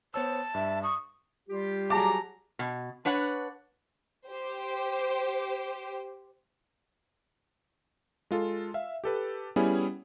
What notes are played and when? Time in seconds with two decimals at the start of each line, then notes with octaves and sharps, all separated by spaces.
0.14 B3 C5 C#5 A5 E6
0.55 G2 E5
0.83 C#6 D#6
1.49 G3 F4 G4
1.90 F#3 G#4 A5 A#5 D6
2.59 B2
3.05 D4 B4 C#5 F#5
4.28 G4 C5
8.31 G#3 F4 A4
8.74 E5 F5
9.04 G4 A4 B4
9.56 G3 B3 C#4 E4 G#4